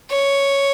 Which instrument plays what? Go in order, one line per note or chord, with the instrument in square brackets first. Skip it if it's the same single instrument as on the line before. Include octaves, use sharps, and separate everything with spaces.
[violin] C#5